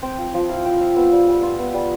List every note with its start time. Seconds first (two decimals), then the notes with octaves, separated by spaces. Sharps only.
0.02 C4 G5
0.18 F3
0.34 F3
0.49 E4 F5
0.65 C4 G5
0.76 F3 E5 F5
0.96 B3 E5
1.12 G3
1.28 G3
1.43 F4
1.59 B3
1.74 G3